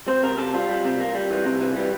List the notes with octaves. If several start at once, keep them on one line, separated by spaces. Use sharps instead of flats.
C4 C5
C3 A#4
C3 A4
G3 F4
G3
C3
A#3
G3
E3
C3
E3
G3